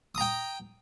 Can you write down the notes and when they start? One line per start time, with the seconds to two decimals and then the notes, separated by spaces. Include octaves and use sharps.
0.15 D#6
0.18 A#5
0.21 G5